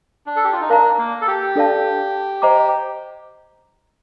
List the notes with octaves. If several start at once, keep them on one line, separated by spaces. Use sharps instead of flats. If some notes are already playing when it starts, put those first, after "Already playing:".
D4
A4
G4
F4
D#4
D4 A#4 F5 A#5
A#3
A4
G4
D4 A4 D5 F5 A5
C5 D#5 A#5 D6